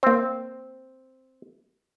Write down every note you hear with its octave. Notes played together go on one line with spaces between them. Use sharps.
A#3 C4 C5